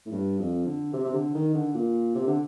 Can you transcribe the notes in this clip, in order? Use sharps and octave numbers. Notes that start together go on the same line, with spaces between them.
A2
G2
F2
D3
C3
C3
D3
D#3
D3
A#2
C3
D3